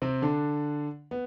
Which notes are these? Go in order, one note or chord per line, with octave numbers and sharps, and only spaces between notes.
C3 C4
D3 D4
B3